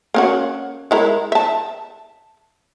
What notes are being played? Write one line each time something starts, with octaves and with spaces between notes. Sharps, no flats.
A#3 C#4 F#4
G#3 E4 A#4
E5 A5